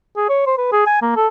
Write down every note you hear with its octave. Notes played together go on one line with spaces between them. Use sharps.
G#4
C#5
C5
B4
G#4
G#5
A#3
A4